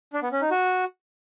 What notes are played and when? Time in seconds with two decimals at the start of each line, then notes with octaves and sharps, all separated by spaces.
0.13 D4
0.23 B3
0.32 C#4
0.41 D#4
0.51 F#4